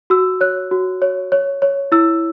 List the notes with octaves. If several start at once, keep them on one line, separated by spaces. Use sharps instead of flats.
F#4 E6
C#5 F#6
F#4
C#5
C#5
C#5
E4 E6